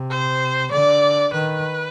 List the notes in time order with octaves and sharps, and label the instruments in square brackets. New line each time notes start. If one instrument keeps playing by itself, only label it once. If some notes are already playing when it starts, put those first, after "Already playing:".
Already playing: [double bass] C3
[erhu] C5
[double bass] D3 [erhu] D5
[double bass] D#3 [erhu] B4